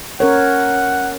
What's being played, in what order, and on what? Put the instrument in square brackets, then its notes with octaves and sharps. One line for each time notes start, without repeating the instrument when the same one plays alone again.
[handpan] C#4 A#4 C#5 [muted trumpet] F#5